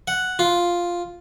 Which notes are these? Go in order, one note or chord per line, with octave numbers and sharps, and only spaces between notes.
F#5
F4